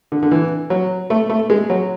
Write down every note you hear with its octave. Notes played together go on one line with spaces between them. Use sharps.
D3
D3
E3
F#3
A3
A3
G#3
F#3